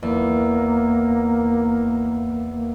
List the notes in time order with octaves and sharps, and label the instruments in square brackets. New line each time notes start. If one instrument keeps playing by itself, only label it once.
[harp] E2 [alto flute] A#3
[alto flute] A#3